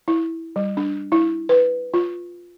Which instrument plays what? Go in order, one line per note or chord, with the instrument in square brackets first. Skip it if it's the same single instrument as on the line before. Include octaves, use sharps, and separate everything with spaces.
[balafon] E4
G3
D4
E4
B4
F4